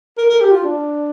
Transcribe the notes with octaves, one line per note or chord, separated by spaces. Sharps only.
A#4
A#4
G4
F4
D4